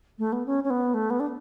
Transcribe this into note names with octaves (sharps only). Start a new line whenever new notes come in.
A3
B3
C#4
C#4
B3
A3
B3
D4